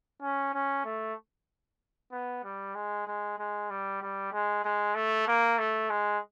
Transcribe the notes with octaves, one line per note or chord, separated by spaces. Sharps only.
C#4
C#4
A3
B3
G3
G#3
G#3
G#3
G3
G3
G#3
G#3
A3
A#3
A3
G#3